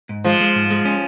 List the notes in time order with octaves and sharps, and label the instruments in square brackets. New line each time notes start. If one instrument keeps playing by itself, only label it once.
[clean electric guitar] G#2
[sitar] F3 [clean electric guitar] G#3
[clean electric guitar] G#3
G#2
G#3
C#4